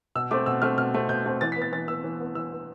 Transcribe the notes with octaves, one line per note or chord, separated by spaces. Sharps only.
B2 E6
A3 C4 D6
B2 E6
A3 C4 F6
B2 F6
A3 C4
B2 G6
A3 C4
E3 A6
B3 B6
A6
E3 A6
B3 E6
E3
B3
E3 E6
B3